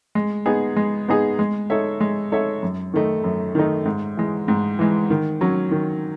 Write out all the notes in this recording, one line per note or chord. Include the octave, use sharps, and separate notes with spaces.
G#3
B3 D#4 G#4
G#3
B3 D#4 G#4
G#3
D#4 A4 C#5 E5
G#3
D#4 A4 C#5 E5
F#2
D#3 A3 D#4
F#2
D#3 A3 D#4
G#2
E3 G#3
G#2
E3 G#3
D#3
F#3 C#4
D#3